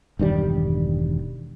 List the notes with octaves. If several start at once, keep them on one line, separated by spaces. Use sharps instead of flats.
E1 G2 D#3 G3